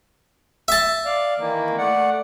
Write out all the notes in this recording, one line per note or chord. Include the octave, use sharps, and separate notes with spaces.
E5 A5
D5 F5
D#3 E3 A#3
A3 D5 F#5